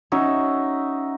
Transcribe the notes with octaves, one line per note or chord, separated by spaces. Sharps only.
C#4 D#4 F#4 E5